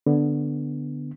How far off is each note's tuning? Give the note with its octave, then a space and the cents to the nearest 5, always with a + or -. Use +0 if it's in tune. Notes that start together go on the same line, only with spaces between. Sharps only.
D3 +0 B3 +0